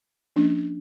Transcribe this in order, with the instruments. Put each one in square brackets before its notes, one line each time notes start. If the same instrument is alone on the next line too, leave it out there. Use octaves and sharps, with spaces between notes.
[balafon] F3 A#3 C#4 D4